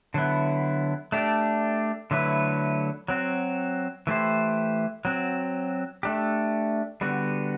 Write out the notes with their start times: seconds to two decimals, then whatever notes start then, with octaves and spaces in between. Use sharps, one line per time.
0.14 D3 F#3 B3 E4
1.12 A3 D4 G4
2.11 D3 F#3 A3 E4 B4
3.08 F#3 C4 F#4
4.07 E3 A3 E4 G4 C5
5.05 F#3 C4 F#4
6.03 A3 D4 G4
7.01 D3 G3 B3 F#4